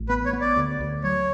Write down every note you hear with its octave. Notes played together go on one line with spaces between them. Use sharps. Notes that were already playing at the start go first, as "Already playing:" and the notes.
Already playing: A1
B3 B4
C#5
B3
D5
D2
D2
F#3 C#5